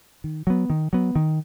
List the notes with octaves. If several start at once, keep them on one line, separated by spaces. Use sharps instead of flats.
D#3
F#3 B3
D#3
F#3 B3
D#3